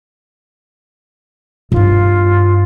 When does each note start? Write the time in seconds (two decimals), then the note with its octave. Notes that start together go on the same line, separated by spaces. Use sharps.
1.72 G2 E4 F4